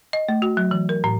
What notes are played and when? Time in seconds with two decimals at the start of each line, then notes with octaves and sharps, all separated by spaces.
0.13 D#5
0.29 A3
0.42 F#4
0.57 F#3
0.71 E3
0.89 A#4
1.04 A2